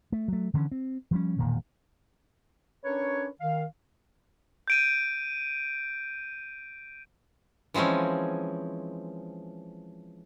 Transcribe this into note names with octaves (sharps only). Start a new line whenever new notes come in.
A3
F#3 A3
D3 E3 C4 C#4
C4
F3 G3 C#4
E1 A#2 D#3
C#4 D4 A#4 B4 C#5
D#3 F5
G6 D7 D#7
E3 F3 G#3 C4 C#4